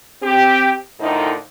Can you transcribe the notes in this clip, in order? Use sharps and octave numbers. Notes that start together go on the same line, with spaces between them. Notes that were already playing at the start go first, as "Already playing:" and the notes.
C4 G4
A2 D3 D#3 F3 D#4